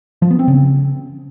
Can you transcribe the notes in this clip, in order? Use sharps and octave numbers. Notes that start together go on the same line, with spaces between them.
F3
B3
C4
C#3